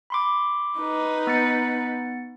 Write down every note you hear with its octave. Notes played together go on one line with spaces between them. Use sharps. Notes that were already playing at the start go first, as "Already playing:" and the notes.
B5 C6 D6
D#4 B4
B3 A6 C#7